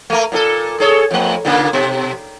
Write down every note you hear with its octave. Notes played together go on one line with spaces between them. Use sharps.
A3 A#3
A#2 D4 A4
G#4 A4 C#5
F2 A3
A#2 C#3 A#3
B2